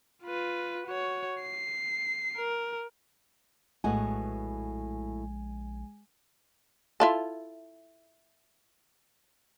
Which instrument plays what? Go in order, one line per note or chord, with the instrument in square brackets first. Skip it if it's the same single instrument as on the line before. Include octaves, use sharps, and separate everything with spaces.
[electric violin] F4 B4
F#4 C#5
C7
A#4
[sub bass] A#1 [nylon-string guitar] A2 B3 F#4 [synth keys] G#3 G#5
[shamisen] E4 F4 A4